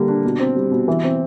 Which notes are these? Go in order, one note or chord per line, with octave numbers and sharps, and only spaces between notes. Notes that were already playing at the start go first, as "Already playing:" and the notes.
Already playing: D3 G3 A#3
D4
B2
C4
G3
B2
E3
C4